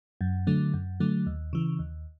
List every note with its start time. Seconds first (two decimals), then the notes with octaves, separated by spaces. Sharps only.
0.21 F#2
0.47 D3 F#3 A3
0.74 F#2
1.00 D3 F#3 A3
1.26 D#2
1.53 C#3 E3
1.79 D#2